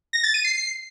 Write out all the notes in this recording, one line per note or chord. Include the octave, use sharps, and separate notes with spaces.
A#6
A6
D#7
C7